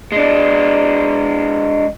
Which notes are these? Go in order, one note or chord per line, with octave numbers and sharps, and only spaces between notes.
G#3 D4